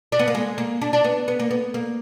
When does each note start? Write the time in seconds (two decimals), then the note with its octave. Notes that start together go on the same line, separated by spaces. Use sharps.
0.12 D4
0.19 B3
0.28 A#3
0.35 G#3
0.58 A#3
0.82 D4
0.93 D4
1.04 B3
1.28 B3
1.40 A#3
1.51 B3
1.74 A#3